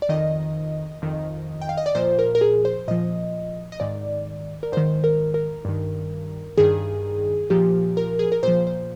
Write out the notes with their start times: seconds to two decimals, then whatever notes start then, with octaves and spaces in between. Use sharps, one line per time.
0.02 D5
0.09 F2 D#3 D#5
1.02 F2 D#3
1.61 G5
1.69 F5
1.77 D#5
1.86 D5
1.95 A#2 F3 C5
2.19 A#4
2.35 A#4
2.41 G#4
2.65 C5
2.88 A#2 F3 D#5
3.72 D#5
3.80 G#2 D#3 D5
4.63 A#4
4.72 G#2 D#3 C5
5.04 A#4
5.34 A#4
5.65 G2 D#3
6.58 G2 D#3 G#4
7.50 A#2 F3 G4
7.97 A#4
8.19 G#4
8.32 A#4
8.43 A#2 F3 C5
8.67 C5